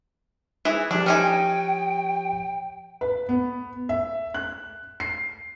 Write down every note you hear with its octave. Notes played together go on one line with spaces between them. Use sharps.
E3 E4 G#4
F3 D4 G4
C#4 D#4 G5 G#5
B4
B3
E5
F#6
C7